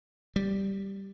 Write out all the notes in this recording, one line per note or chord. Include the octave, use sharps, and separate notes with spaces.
G3